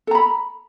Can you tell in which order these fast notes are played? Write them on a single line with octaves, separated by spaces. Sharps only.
A4 A#5 B5